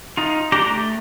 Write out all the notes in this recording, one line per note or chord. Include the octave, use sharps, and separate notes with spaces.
D#4 F4
D4 G4 A#5
A3